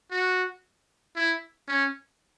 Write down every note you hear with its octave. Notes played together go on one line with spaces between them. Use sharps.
F#4
E4
C#4